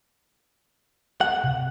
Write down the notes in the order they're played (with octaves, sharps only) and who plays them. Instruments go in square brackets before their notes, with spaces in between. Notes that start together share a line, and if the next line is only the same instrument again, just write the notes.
[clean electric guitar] F#5
[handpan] C3